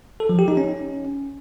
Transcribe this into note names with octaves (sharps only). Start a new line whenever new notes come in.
A4
F3
G4
D#4
C#4